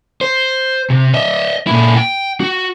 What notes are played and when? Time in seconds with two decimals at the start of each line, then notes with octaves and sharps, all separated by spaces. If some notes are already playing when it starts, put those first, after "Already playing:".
0.21 C5
0.90 C3
1.14 D#5 E5
1.67 A#2 E4
1.96 G5
2.40 F#4